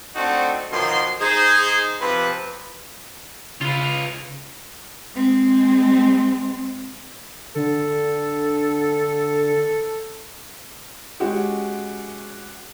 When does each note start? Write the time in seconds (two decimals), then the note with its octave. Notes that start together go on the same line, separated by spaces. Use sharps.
0.15 A3 C4 D4 D#4 F#4
0.71 F#2 B2 D#3 F3 F#3 C6
1.20 D#4 G#4 C5
2.00 C3 F3 C4 B4
3.61 C#3 F4 B4
5.15 G#3 C4
7.56 D3 A4
11.20 G#3 C#4 F#4 G4